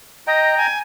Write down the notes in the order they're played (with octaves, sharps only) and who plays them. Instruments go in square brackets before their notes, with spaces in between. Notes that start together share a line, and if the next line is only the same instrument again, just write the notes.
[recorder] D#5 [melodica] G5 A#5
[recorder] G#5